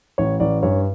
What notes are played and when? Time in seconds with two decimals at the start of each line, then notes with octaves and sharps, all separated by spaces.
0.18 A1 C#5
0.40 A1 D5
0.63 G2 C#5